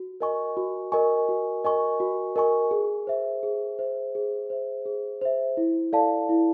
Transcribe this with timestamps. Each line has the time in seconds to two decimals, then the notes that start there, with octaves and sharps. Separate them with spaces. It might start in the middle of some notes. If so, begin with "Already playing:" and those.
Already playing: F#4
0.21 A#4 D#5 G#5 C#6
0.57 F#4
0.92 A#4 D#5 G#5 C#6
1.29 F#4
1.64 A#4 D#5 G#5 C#6
2.00 F#4
2.36 A#4 D#5 G#5 C#6
2.71 G#4
3.07 C5 E5
3.43 G#4
3.79 C5 E5
4.15 G#4
4.50 C5 E5
4.86 G#4
5.22 C5 E5
5.57 E4
5.93 A4 D5 F5 A5
6.29 E4